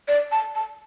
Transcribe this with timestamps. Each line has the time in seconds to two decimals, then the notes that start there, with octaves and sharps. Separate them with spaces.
0.08 D5
0.32 A5
0.55 A5